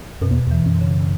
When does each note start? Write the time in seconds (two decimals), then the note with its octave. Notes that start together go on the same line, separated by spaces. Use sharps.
0.21 F#2 B2
0.31 E2
0.47 E2 E3
0.66 F#2
0.81 C#3